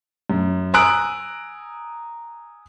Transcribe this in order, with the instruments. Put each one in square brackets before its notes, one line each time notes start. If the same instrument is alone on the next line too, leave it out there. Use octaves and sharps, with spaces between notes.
[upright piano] F#2
G#5 A#5 D#6 E6 F#6 D7